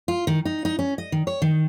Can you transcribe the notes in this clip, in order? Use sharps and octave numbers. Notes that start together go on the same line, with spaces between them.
F4
D#3
D#4
D#4
C#4
D#5
D#3
C#5
D#3